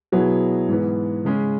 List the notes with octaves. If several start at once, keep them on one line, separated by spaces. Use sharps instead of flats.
B2 F#3 B3 E4 G#4
G#2 E3 B3
C#3 G#3 C#4 G#4